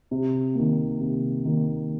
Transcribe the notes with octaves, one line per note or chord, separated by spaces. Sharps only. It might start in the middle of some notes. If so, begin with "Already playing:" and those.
C3
D#3 A#3
C3
D#3 A#3